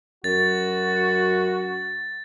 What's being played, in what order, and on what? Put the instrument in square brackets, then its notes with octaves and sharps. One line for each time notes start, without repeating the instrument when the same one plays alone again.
[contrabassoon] F#2 [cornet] F#4 [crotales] A6